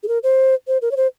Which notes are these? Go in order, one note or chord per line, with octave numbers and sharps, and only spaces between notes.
G#4
A#4
C5
C5
A#4
C#5
C5